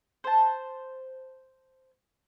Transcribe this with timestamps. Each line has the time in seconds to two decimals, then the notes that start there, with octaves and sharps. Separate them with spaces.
0.24 C5 A5